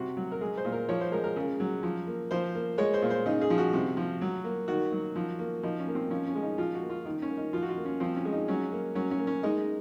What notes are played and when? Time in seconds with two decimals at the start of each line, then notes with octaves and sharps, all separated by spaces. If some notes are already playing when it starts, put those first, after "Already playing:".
Already playing: C3 F#4
0.17 F#3
0.32 A#4
0.41 G#3 G#4
0.57 C5
0.65 A#2
0.72 A#4
0.89 F3 C#5
1.01 C5
1.12 G#3 A#4
1.24 A#4
1.36 C#3
1.60 F#3
1.83 F3
2.07 A#3
2.31 F3 C5
2.55 A#3
2.78 G#3 C#5
2.94 C5
3.02 A#2
3.10 C5
3.26 C#3 D#4
3.42 G#4
3.50 F3
3.58 F#4
3.73 C3
3.97 F3
4.21 F#3
4.44 A#3
4.68 D#3 F#4
4.92 F#3
5.16 F3
5.39 A#3
5.63 F3 D#4
5.79 C#4
5.88 A#3
5.95 C4
6.10 F3 C#4
6.27 C#4
6.35 G#3
6.43 D#4
6.58 F3 F4
6.75 F#4
6.82 A#3
6.90 F4
7.05 D#3 D#4
7.22 C#4
7.30 A#3
7.37 D#4
7.53 F3 F4
7.62 F#4
7.69 F4
7.77 A#3
7.85 C#4
8.00 F3 C4
8.17 C#4
8.25 G#3
8.33 D#4
8.48 F#3 C#4
8.72 A#3
8.95 F#3 C#4
9.11 C#4
9.19 A#3
9.27 C#4
9.43 G#3 D#4